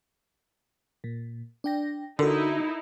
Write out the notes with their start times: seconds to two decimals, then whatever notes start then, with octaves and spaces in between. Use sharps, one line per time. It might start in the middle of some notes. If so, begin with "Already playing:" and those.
1.04 A#2
1.64 D4 G5 A#6
2.19 D3 D#4 E4 F#4 A4 A#4